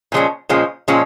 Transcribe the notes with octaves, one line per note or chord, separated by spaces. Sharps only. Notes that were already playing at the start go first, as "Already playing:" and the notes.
A#2 F3 G#3 C#4
A#2 F3 G#3 C#4
A#2 F3 G#3 C#4